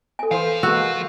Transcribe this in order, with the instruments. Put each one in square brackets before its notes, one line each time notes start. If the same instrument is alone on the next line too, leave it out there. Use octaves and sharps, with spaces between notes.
[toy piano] A4 G#5
[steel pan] E3 C5 [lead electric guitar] F3 F5
[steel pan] E3 G#3 A#3 [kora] F#4 [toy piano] E6